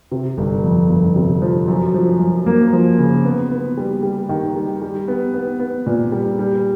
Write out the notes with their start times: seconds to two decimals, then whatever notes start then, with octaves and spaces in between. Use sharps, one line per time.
0.11 C3
0.38 G1
0.64 F2
0.89 G1
1.16 C3
1.42 F3
1.68 F#2
1.94 F3
2.20 F#2
2.46 A#3
2.73 F3
2.99 C#3
3.25 B3
3.51 B3
3.77 G3
4.03 G3
4.29 D#3
4.55 G3
4.82 G3
5.08 B3
5.34 B3
5.59 B3
5.86 A#2
6.12 G3
6.39 G3